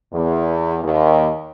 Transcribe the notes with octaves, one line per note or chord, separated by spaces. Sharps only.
E2
D#2